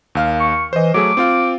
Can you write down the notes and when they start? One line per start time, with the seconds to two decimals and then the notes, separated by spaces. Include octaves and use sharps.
0.15 D#2 F5 F6
0.40 C#6
0.73 E3 C5 D#5
0.94 F#3 A3 G#4 D6
1.17 C4 F4 F5